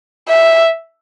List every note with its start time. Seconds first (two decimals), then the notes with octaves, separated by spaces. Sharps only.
0.29 E5